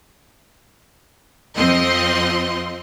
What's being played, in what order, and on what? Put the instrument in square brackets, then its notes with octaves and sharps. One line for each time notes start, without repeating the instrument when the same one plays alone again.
[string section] F2 F3 C4 D#5 C6